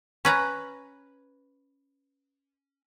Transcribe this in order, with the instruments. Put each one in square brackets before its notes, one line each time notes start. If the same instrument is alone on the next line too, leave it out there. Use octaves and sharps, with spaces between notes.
[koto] C#4 B4 A#5